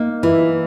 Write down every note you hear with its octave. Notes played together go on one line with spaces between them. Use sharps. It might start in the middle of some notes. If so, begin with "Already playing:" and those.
Already playing: A#3 D#4
E3 E4